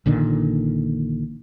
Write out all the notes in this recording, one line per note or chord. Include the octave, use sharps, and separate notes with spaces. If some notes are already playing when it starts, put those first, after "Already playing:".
A#1 A#2 D3 D#3